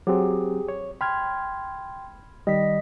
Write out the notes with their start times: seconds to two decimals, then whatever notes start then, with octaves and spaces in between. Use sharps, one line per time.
0.07 F#3 C4 G4 G#4
0.68 C#5
1.01 G5 B5 C6 F6 G#6
2.47 D#3 G3 D#5 B6